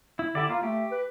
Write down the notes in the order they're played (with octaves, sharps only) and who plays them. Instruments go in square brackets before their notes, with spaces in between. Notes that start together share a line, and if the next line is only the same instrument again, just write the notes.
[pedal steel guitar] E4
[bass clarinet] D3 [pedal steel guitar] E4 G4 D5
[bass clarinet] A#3 [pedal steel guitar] F4
[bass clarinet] A3 [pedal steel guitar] G4
[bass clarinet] B4